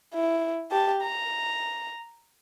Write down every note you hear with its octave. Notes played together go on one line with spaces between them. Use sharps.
E4
G4 A5
A#5